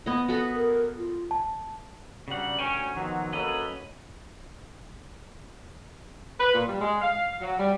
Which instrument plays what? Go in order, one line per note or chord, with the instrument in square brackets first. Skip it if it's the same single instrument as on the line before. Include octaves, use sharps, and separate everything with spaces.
[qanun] B3 D#5
F#4 A4 B4
[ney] A#4
F4
[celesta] A5
[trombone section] G2 F#3 G3 [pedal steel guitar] C#3 F#5
[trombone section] D2 F#3 C#4 [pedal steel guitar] C#5 G5 G#5
[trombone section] B2 F#3 [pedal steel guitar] D#3 F3
[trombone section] F#3 A#3 A4 [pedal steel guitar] C#4 B4 D#5
[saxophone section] B4
A#2
G3
G#3
F5
F#3
G3